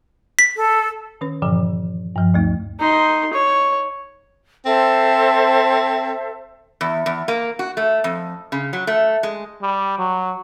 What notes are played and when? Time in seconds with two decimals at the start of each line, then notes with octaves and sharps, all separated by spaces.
0.39 B6
0.56 A4
1.21 D#3 C#4 B4
1.42 G2 A#2 D3 E3 F3
2.16 G2 F3
2.34 D2 A3 D#4
2.80 D#4 C6
3.33 C#5
4.65 C4 A4 C5 E5
6.81 E2
7.06 E2
7.28 A#3
7.59 F#4
7.77 A3
8.04 F2
8.52 C#3
8.73 F#3
8.87 A3
9.23 G#3
9.62 G3
9.98 F#3